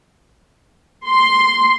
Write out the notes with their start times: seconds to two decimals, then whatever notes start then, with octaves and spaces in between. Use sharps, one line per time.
1.07 C6